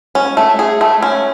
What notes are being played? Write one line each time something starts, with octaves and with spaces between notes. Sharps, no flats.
C#4
A3
G#4
A3
C#4